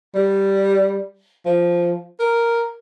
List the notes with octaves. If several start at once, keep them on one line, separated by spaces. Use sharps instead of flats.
G3
F3
A#4